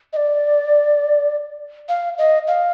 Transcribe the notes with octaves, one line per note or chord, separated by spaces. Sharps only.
D#5
D5
F5
D#5
F5